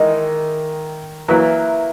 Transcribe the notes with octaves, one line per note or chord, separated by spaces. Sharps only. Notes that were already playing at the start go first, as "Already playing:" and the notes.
Already playing: D#3 E3 G#3 D#4
E3 F#3 A#3 E4 B4